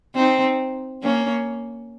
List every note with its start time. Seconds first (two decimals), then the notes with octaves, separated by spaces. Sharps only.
0.15 C4 D#4
1.03 A#3 C#4